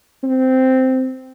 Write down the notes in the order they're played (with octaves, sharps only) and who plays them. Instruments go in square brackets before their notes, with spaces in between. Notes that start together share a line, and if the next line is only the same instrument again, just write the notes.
[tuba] C4